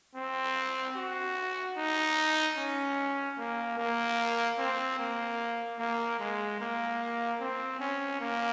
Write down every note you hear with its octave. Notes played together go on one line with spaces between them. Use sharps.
C4
F#4
D#4
C#4
A#3
A#3
C4
A#3
A#3
G#3
A#3
C4
C#4
A#3